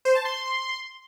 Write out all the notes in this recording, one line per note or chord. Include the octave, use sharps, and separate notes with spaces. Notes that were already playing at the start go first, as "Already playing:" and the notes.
C5
A5
C6